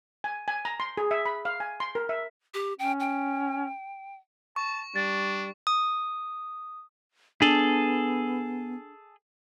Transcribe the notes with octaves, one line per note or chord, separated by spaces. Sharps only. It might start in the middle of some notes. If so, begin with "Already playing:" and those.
G#5
G#5
A#5
C6
G#4
E5
B5
F5
G#5
C6
A#4
E5
G4
C#4 G5
G5
A5 C#6
G3 D4 A6
D#6
B3 D4 G#4 A4